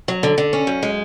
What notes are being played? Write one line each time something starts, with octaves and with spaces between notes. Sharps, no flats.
F#3
D3
D3
C#4
F#2
G#3